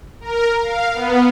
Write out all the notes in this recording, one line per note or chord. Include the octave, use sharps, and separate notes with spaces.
A#4
F5
B3